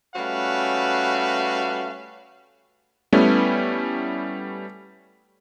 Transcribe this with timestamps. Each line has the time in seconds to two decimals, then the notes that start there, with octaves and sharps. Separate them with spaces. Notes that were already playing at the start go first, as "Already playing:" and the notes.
0.16 G3 A3 C#4 F#4 B4 F5
3.13 G3 A3 B3 C#4 E4